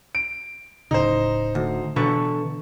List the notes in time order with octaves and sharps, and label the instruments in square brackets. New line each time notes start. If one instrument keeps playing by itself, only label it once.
[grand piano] D7
[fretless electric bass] D1 A2 C#3 [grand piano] D#4 C5
[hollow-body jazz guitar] D2
[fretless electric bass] B2 E3 [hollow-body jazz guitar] D3 A4 B4 [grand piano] C#6